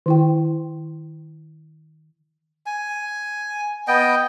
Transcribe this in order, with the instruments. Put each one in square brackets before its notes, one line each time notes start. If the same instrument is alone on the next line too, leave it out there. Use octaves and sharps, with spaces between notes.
[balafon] D#3 E4 G5
[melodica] G#5
B3 D#5 G5